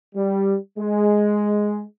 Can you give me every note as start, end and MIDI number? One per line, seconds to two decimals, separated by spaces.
0.15 0.56 55
0.77 1.83 56